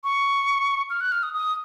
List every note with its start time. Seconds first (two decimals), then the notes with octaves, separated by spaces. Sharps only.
0.04 C#6
0.90 F6
1.01 F#6
1.12 F6
1.23 D#6
1.34 D#6